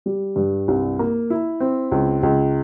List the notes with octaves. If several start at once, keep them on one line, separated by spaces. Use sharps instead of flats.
G3
G2
C2
A#3
E4
C4
C#2
C#2